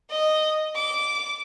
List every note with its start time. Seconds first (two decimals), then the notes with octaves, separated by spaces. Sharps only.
0.10 D#5
0.76 D6